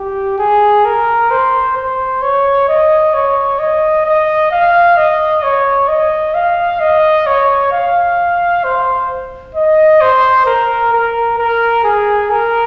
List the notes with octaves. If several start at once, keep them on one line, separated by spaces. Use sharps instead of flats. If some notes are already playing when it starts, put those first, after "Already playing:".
Already playing: G4
G#4
A#4
C5
C5
C#5
D#5
C#5
D#5
D#5
F5
D#5
C#5
D#5
F5
D#5
C#5
F5
C5
D#5
C5
A#4
A#4
A#4
G#4
A#4